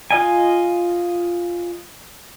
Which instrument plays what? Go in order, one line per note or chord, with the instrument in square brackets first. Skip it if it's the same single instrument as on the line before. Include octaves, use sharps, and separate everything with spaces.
[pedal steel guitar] F4 D#5 G#5